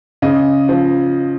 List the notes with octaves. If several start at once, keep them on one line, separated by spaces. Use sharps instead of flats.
C#3 D#5
F3